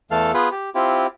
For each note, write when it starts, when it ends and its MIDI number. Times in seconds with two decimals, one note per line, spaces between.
0.11 0.32 40
0.11 0.32 52
0.11 0.32 57
0.11 0.32 69
0.11 0.32 77
0.34 0.49 59
0.34 0.49 65
0.34 0.49 68
0.34 0.49 71
0.51 0.70 67
0.75 1.07 60
0.75 1.07 64
0.75 1.07 65
0.75 1.07 67